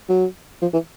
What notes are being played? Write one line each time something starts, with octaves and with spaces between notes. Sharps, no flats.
F#3
F3
E3